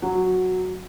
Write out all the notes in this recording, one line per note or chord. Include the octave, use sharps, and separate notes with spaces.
F#3